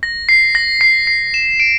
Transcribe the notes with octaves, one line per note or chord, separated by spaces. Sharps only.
A#6
C7
A#6
C7
C7
E7
D7